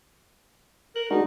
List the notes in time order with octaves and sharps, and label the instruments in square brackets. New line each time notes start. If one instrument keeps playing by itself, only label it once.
[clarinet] A#4 [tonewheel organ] F#6
[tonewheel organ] G#3 D4 F#4 [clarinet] D#4